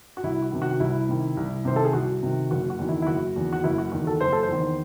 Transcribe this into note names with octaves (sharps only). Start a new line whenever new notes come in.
F#4
C2 E4
F#4
C3 D#3
F#4
C2 E4
C3 D#3
C2
C3 D#3 C5
A4
G#4
C2 F#4
C3 D#3
F#1 F#4
F#4
E2 D#3
E4
E4
F#1 F#4
E2 D#3
F#4
F#1 E4
F#4
E2 D#3 F#4
A4
F#1 C5
A4
C5
E2 D#3